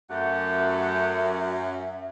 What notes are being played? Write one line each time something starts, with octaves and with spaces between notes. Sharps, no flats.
F#2 A3 G4 E5 F#5